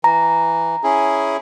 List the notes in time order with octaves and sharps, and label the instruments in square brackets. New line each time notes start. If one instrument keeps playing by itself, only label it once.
[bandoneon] E3 [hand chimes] A#5
[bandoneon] C#4 E4 G#4